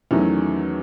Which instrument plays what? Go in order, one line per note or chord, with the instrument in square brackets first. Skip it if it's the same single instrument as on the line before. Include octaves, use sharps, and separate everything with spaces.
[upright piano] E2 D#3 F#3 A3 C#4